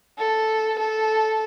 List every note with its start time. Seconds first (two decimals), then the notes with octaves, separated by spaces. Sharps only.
0.19 A4
0.79 A4